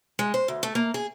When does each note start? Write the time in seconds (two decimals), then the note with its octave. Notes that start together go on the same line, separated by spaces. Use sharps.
0.19 G#3
0.34 C5
0.48 D2
0.63 A3
0.75 A#3
0.94 G#4